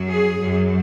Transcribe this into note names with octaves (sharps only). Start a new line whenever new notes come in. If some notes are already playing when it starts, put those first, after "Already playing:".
Already playing: F#2 F#3
G#4
F#2 F#3